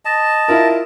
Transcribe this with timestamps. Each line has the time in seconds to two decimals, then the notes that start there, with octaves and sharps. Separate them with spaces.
0.05 D#5 A5
0.48 E4 F4 A#4